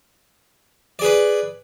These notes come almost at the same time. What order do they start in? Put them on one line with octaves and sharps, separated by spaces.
D5 G#4 B4